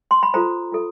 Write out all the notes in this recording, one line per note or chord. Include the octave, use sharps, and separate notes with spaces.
C6
B5
F4 A4 C5 A#5
F4 A4